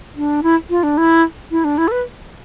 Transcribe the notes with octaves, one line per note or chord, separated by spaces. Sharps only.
D4
E4
F4
D4
E4
E4
D4
E4
A4
B4